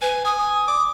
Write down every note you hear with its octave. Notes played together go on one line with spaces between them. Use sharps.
B4 G#5
G#5 D#6
D#6
D6